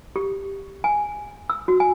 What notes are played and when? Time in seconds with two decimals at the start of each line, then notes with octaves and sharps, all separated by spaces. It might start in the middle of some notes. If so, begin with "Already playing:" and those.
0.16 G4
0.84 G#5
1.50 E6
1.68 F#4
1.80 G#5